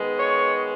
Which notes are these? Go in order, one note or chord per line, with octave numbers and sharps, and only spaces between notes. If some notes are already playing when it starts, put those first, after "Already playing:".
Already playing: D#3 G#3 B3
C#5